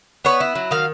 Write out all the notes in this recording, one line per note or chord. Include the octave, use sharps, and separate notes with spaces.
B3 C#5
E4
F#3
D#3 F5